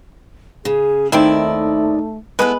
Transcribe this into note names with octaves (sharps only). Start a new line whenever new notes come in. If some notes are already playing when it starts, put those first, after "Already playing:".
C#3 G#4
D#2 D#3 A3 C4 E4 D5
G#3 A3 B3 E4 B4